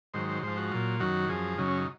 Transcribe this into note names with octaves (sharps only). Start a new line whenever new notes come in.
G#2 D#3 F#3 C5
C5
G#2 F3 C5
F#4
A#2 F#3 F4
F#2 D#3 F#3 F#4
F#2 F3 G#4
F#2 C#3 F#3 D#4
C#4
D#4